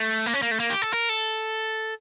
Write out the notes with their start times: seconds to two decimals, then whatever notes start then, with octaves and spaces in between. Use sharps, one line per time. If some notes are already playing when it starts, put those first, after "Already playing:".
Already playing: A3
0.26 A#3
0.34 C#4
0.42 A#3
0.51 A3
0.60 A#3
0.70 G4
0.82 A4
0.93 A#4
1.09 A4